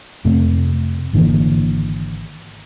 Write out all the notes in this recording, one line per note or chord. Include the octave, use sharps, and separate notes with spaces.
F2 C3 A3
G#1 D3 E3 A#3